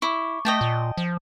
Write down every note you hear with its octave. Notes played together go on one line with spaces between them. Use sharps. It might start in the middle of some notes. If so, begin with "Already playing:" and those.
E4 C#6 D6
A3 D#5 G5 A5
A#2
F3